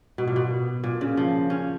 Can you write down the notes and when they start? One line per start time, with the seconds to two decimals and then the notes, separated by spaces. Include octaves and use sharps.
0.18 B2
0.28 A#2
0.36 B2
0.84 A#2
1.01 C#3
1.17 F3
1.50 C#4